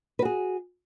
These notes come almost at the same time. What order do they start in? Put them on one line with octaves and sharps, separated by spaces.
B4 F#4 G#4